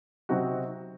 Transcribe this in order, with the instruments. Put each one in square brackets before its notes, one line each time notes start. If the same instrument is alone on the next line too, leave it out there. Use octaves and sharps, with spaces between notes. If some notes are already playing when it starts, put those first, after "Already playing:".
[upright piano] C3 F#3 C4 D#4 F#4